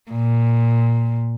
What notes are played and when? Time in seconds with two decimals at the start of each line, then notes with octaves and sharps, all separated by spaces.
0.11 A#2